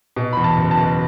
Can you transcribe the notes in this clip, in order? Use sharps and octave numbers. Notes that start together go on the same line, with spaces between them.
B2
E2 B5
A5
F#1
A5
B2